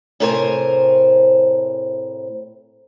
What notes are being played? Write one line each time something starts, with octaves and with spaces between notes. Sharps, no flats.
A2 C3 A#4 C5 D5 G#5